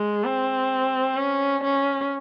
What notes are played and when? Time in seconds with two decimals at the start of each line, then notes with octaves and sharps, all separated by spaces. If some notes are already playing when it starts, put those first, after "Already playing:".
Already playing: G#3
0.25 C4
1.17 C#4
1.64 C#4